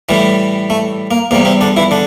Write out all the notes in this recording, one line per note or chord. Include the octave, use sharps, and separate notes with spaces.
A2 E3 G3
A3
A#3
E2 C3 G3 A#3
C3 C4
D3 D4
E3 E4
D3 D4